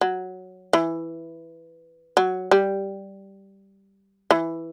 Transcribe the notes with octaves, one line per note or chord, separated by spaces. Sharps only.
F#3
E3
F#3
G3
E3